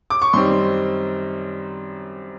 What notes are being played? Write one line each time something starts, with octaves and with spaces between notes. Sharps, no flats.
D6
C#6
F#2 D#3 G3 C4 C6